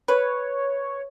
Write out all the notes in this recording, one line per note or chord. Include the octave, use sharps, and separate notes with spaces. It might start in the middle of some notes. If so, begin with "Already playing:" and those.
B4 C#5